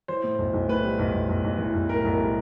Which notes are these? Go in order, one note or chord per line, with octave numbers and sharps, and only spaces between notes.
E3 C5
A2
B1
B1
A2 B4
G3
B1
B1
B1
B1
E3
B1
A2 A#4
B1 A#4
G3